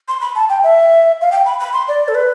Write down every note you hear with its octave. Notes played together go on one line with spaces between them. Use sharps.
C6
B5
A5
G5
E5
F5
G5
B5
B5
C6
D5
A4
B4